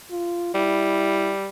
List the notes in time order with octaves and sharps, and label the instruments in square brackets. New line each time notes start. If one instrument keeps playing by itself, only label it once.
[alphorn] F4
[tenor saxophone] G3 [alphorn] E4